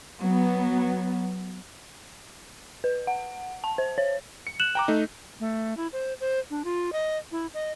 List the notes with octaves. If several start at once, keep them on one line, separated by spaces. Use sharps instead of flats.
F#3 B3
B4
F#5
A5
C5
C#5
C#7
F#6 E7 F#7
G5 A#5 D6
A3 D#4
A3
E4
C5
C5
D4
F4
D#5
E4
D#5